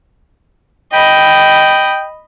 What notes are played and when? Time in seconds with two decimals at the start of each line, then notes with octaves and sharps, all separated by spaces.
0.93 D#5 G5 B5